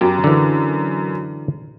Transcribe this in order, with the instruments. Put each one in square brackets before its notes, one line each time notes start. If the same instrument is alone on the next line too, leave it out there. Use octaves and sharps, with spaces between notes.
[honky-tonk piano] F#2 [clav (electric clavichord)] G4
[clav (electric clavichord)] D3 E3